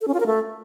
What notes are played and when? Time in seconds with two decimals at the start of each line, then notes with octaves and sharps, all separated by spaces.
0.01 A4
0.08 C#4
0.14 F4
0.20 A#4
0.26 A3